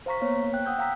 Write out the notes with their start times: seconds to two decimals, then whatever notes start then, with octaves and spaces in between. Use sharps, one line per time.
0.06 C5 F5 A#5 C#6 B6
0.21 A#3 B3 C#5 F5
0.53 G5 F#6
0.66 F#5 G5 D#6 E6 G6
0.79 F5 G5 A#5 E6 B6